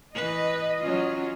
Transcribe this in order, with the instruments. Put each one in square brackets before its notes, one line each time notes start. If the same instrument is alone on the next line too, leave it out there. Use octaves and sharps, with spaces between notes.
[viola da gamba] E3 B4 [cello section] D#5
[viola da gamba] F#3 C#4 F4